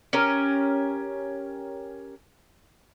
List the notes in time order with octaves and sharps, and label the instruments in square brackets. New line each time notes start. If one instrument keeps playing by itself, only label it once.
[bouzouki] C#4 G4 A#4